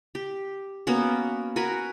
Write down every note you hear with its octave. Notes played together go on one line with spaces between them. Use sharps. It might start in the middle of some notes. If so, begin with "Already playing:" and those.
G4
A#3 B3 C#4 F#4
F#4 A#4 G#5 B5